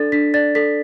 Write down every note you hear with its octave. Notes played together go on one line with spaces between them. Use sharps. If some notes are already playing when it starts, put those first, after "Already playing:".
Already playing: D4 A4 D5 A6
D4 B6
D5 A6
A4 B6